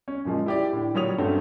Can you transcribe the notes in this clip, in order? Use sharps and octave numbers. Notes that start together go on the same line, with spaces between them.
C#4
F#2 A#2 F3 G#3
E4 G4 D5
A2 D3
A#2 F#3 G3 C#5 D#6 F7
G2 A3 C4 C#4 F#4